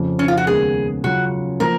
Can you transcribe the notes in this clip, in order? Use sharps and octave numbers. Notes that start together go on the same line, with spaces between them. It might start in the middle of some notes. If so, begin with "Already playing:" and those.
Already playing: F2 C#3 F3
C#4
F4
F#4
D#2 C#3 G#3 B3 G#4
C#3 F#3 C#4 F4 F#4
F3 A#3 A#4